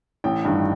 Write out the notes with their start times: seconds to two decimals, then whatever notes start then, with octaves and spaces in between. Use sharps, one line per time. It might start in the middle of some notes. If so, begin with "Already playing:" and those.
0.24 A1 G5
0.45 G2 D#3